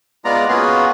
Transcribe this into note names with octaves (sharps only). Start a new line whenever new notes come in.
G#3 B3 F4 D5 A#5
A#3 B3 C#4 F4 F#4 G#4